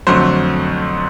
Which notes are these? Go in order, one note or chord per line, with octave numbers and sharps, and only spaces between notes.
F2 D3 F#3 A3 C5